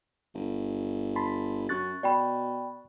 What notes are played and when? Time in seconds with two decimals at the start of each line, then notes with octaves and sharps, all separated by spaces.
0.35 G1
1.16 A5 B5 C6
1.69 F#2 C#6 F#6 A6
2.03 B2 D5 G5 B5